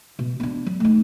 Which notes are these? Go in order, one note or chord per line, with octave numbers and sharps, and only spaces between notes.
B2
B3 D4
F#3
A3 D#4